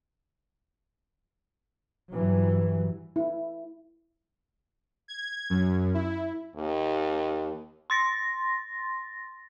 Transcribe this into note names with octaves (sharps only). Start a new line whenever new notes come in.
G2 E3 F#3
E4
G#6
F#2
E4
D#2
C6 A6 A#6